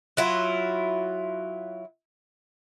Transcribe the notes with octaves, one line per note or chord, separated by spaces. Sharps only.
F#3 E4 F4